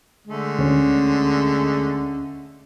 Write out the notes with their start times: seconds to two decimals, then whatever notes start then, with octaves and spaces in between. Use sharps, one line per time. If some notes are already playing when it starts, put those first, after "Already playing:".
0.27 D3 G#3 A3
0.59 D2 C#4